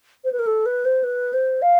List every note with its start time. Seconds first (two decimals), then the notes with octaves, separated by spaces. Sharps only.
0.24 C5
0.32 B4
0.39 A#4
0.46 A4
0.65 B4
0.85 C5
1.03 B4
1.33 C5
1.62 F5